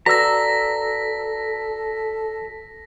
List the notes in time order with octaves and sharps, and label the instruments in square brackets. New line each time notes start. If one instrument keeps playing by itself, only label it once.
[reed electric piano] F#4 B4 D5 [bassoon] A4 [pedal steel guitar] A#5 E6 [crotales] A#6 B6